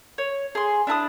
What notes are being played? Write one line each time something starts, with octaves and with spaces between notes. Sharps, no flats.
C#5
G#4 C6
D4 E4 A5 D#6